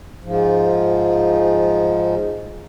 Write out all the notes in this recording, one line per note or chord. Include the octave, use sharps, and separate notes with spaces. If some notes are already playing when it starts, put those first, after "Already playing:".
G#2 F3